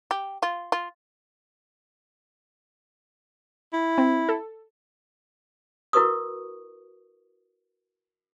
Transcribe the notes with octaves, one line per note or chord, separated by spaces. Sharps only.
G4
F4
F4
E4
C4
A4
E4 F#4 A#4 B4 C#6 D#6